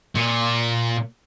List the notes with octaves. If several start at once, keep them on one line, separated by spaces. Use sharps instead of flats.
A#2